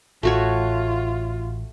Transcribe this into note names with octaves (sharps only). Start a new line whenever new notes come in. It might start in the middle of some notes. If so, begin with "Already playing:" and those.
A1 A3 F4 F#4 C#5